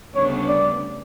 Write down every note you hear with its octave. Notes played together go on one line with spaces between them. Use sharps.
D2 C#3 G3 B3 D4 C#5
D5